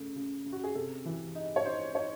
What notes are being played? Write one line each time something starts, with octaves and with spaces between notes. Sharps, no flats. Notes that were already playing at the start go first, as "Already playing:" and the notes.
Already playing: C#3 A3
C#3
C#3
F#4
G#4
C3 A4
E3
D#4
C#5
D#4 C5
D#4 C#5